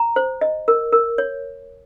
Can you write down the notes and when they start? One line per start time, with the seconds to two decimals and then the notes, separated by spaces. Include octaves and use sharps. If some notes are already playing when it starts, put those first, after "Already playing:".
Already playing: A#5
0.16 C5
0.41 D#5
0.68 A#4
0.92 A#4
1.18 C#5